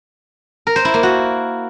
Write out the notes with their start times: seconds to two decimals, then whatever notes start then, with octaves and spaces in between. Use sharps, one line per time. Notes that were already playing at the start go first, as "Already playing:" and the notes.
0.67 A#4
0.76 C5
0.85 E4
0.94 A#3
1.03 F#4